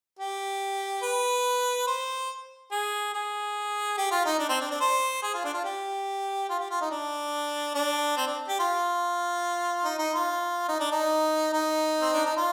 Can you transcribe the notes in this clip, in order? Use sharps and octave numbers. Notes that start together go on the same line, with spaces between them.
G4
B4
C5
G#4
G#4
G4
F4
D#4
D4
C4
D4
D4
C5
G#4
F4
D4
F4
G4
F4
G4
F4
D#4
D4
D4
C4
D4
G4
F4
D#4
D#4
F4
D#4
D4
D#4
D#4
C4
D4
D#4
F4